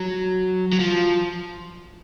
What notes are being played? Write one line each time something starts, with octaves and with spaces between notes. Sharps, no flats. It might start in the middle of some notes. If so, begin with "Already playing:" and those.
Already playing: F#3
F#3
F3